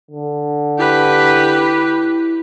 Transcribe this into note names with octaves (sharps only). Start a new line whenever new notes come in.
D3
E4 G4 B4